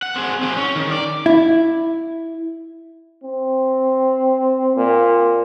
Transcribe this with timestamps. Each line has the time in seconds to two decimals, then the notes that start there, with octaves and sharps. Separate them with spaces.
0.03 F#5
0.16 C4 G#4
0.43 C4 G#4
0.57 C#4
0.76 D#3
0.91 D5
1.26 E4
3.24 C4
4.76 A#2